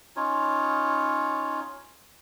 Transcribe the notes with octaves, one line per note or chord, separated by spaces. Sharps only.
C#4 D#4 F4 C#5